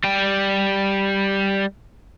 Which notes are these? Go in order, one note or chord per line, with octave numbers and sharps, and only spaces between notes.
G3 G5